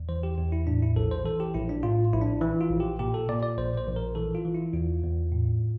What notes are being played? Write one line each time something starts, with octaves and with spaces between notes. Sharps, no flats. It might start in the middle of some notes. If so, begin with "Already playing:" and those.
Already playing: E2
E3 C5
G4
E2 G4
E4
A2 D4
E4
A#1 A4
C5
E3 A4
G4
A#1 E4
D4
A2 F4
A#1 E4
D4
E3 E4
F4
A#1
G4
A#2 G4
A4
A#2 D5
D5
A#1 C5
C5
A#1
A#4
E3 A4
F4
E3
E4
E2 F4
E2
A2